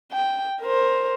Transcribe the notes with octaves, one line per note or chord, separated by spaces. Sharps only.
G5
A#4 C5